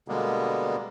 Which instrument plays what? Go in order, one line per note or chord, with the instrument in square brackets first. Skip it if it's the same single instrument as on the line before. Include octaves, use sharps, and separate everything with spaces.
[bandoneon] B2 D3 G3 G#3 A#3 B3